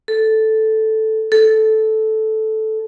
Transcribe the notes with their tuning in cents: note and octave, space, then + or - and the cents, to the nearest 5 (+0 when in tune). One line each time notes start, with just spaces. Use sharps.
A4 -5
A4 -10